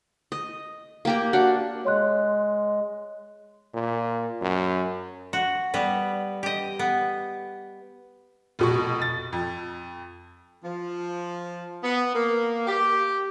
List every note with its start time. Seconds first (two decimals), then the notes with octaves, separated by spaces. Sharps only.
0.32 D#5
1.05 A#3 G4 A#4
1.33 D4 F#4
1.85 G#3 C#5 C6 F#6
3.74 A#2
4.42 F#2
5.33 F#4
5.74 G3 B3 B4
6.43 G4 D#5
6.79 B3
8.59 F1 B2 C#6
9.02 A6
9.33 F2
10.64 F3
11.83 B3
12.15 A#3
12.67 G4